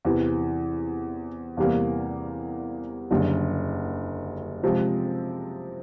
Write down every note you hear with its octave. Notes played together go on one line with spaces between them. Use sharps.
E2 C3 E3
E2 C3 E3 G3 A#3
F#1 F#2 D3 G3
C3 F3 G#3 C4